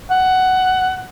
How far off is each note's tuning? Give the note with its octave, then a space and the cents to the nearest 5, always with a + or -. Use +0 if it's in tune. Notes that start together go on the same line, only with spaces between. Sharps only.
F#5 +10